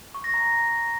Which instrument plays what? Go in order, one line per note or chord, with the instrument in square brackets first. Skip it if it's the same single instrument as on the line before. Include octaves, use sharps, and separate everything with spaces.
[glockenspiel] C#6
A#6
A#5